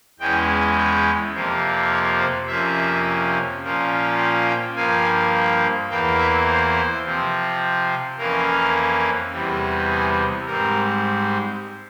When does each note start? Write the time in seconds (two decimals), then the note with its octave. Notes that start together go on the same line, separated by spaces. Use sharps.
0.19 E2 E3 G#3 C#4 G5
0.77 G5
1.33 F2 C3 F3 A#3
1.90 C#5
2.19 C5
2.47 F2 C3 F3 A#3 C#4 E5
3.61 A#2 F3 A#3 C#4
4.18 G5
4.47 G5
4.76 G2 F3 A#3 G#5
5.89 E2 E3 A#3 G5
6.18 E5
6.47 C5
7.03 C3 F3 C4
8.18 F2 E3 A#3 C#4 A#4
9.32 E2 C3 E3 G3
9.89 G#4
10.46 G#2 G3 C4 A#4